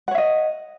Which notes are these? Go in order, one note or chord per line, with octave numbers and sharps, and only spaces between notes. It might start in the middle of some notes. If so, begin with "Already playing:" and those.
C#5 D#5 E5 F#5